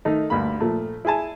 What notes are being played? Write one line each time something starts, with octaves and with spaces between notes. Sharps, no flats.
D#3 A3 D#4
D2 G2 A#3 B5
A#2 F3 A3 A#3
E4 G#4 G#5 A5